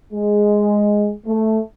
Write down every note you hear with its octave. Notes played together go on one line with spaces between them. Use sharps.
G#3
A3